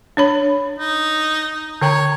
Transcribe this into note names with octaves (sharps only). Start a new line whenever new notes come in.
D4 C#5 B5
D#4
D3 C#5 G5 A#5